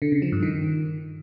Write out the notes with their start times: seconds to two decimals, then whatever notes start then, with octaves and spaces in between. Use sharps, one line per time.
0.02 D3
0.12 C#3
0.22 F3
0.32 G2
0.43 D#3